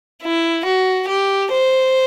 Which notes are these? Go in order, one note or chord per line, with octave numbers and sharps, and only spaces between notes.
E4
F#4
G4
C5